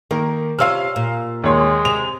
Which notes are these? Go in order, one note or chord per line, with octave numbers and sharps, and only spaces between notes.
D#3 A#3 A#4
C3 C#4 F4 F5 E6 F6
A#2
D#2 G#3 C#5 C6
C3 F7